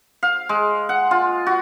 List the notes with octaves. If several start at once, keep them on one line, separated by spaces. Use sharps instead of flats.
F5
G#3
F#5
F4
F#4